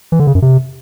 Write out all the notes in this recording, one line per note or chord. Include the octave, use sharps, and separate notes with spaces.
E3
D3
C#3
F#2
C3